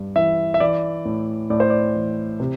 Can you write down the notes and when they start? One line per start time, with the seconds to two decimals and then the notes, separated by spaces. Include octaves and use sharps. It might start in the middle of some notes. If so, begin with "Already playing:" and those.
Already playing: G2
0.16 E3 E5
0.54 E5
0.60 E3 D5
1.05 A2
1.50 A2 D5
1.60 C5
1.70 D5
1.95 E3
2.40 C3